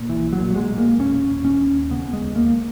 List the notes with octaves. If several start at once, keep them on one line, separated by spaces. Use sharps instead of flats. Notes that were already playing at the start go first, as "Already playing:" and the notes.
Already playing: A#2
B1 E3
F#3
A#2
F#3
G#3
A#2
A#3
E1 C#4
E1
C#4
D#2
C#3 B3
G#3
D#2
A#3